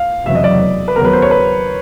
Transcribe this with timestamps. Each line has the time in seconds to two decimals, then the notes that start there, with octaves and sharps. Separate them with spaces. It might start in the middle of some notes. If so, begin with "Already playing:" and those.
Already playing: F5
0.26 F1 E2 C#3 F#3 E5
0.35 D#5
0.44 D5
0.88 B4
0.95 D#2 C#3 F#3 B3 A#4
1.05 B4
1.13 C5
1.22 C#5
1.31 B4